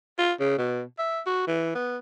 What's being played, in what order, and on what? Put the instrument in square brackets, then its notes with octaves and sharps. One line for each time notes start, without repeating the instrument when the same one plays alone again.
[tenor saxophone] F4
C#3
B2
E5
F#4
E3
B3